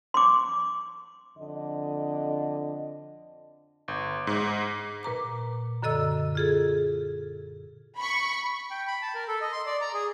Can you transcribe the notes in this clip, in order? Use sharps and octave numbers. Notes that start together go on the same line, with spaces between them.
C6 D6
F2 D3 D#5
G1
G#2
A#2 B4 A#5 D6
F#2 D3 A4 D#5 E6
F4 G#4 A4
B5 C#6
G5
B5
A5
A#4
A4
D#5
C6
D5
A#5
G#4